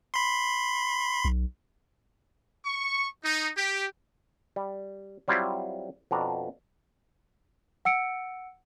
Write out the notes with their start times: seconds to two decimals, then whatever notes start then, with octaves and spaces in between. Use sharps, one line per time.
0.14 B5 C6
1.25 B1
2.65 C#6
3.24 D#4
3.57 G4
4.56 G3
5.28 F#3 G3 C4 E4 F4
6.11 F2 B2 D4 A#5
7.85 F#5 E6 C#7 D7